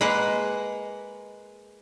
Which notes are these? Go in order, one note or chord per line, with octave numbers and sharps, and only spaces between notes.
G#3 A#3 B4 F#5